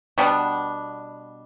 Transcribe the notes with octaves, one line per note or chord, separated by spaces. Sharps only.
B2 G3 B3 D4